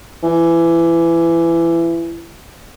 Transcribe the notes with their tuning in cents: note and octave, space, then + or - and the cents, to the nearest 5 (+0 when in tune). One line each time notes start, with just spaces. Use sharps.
E3 +25